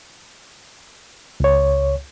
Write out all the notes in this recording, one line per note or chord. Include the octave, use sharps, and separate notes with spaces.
C#2 C#5